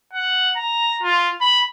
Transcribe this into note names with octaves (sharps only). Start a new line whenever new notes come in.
F#5
A#5
F4
B5